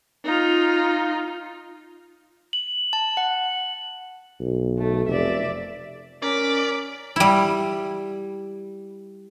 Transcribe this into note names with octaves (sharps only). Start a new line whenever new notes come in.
D#4 F4
F#7
A5
F#5
B1
A3
F1 D5 E5
C#4 A#4 D5 D6 B6
G3 E4